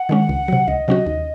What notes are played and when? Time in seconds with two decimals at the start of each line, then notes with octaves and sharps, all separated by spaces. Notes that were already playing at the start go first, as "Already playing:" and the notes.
Already playing: F#5
0.09 D#3 G#3 C#4
0.29 C#2
0.48 C3 F#3
0.67 C#2 D#5
0.88 C3 F#3 C#4 F#4
1.06 D#2